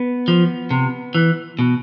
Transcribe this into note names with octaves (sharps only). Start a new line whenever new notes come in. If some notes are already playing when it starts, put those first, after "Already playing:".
Already playing: B3
F3
C3
E3
B2